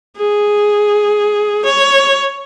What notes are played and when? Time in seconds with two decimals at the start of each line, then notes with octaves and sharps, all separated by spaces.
0.17 G#4
1.65 C#5